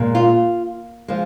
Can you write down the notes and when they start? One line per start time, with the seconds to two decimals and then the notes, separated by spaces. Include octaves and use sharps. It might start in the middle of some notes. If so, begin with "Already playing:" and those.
Already playing: A#2 G#3
0.15 F4
1.08 F3 G#3